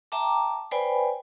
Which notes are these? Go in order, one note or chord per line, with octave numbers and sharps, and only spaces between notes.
E5 G5 A5 A#5 D6
B4 C5 D5 G5 G#5 B5